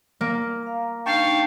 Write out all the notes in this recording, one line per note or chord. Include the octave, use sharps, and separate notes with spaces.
A#3
F5 A#5
D4 D#4 F5 G5 A5 C#6